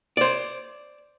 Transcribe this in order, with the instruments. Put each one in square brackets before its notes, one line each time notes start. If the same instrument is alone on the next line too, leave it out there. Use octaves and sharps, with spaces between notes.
[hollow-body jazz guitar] C5 D5